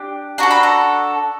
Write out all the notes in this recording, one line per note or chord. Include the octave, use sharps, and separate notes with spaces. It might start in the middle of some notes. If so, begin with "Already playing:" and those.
Already playing: D4 G4
D4 F#4 A4 A#5
B5
A#5